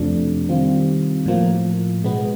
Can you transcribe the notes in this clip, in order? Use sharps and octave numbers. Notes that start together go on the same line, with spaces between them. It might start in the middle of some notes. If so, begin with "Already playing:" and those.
Already playing: F2 C3 F3 A3 D4
D#3 G3 C4 F4
A2 F3 A#3
B2 G#3 B3